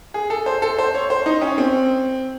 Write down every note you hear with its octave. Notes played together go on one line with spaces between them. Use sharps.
G#4
A4
C5
A4
C5
C#5
C5
D#4
C#4
C4